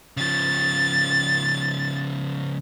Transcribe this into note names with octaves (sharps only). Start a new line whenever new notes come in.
C#3 F3 A6